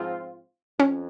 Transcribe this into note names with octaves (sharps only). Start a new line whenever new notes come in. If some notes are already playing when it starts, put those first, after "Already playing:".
Already playing: G#2 F3 C4 F4
F2 C#4